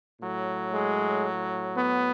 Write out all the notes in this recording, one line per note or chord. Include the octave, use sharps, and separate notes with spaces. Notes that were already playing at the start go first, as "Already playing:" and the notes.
A2 F#3
G#3
B3